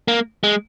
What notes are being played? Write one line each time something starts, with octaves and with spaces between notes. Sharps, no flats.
A#3
G#3